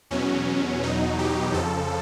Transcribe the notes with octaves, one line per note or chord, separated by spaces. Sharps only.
E2 B2 F#3 C#4
E2 B2 F#3 D#4
G4
F2 C#3 F3 A4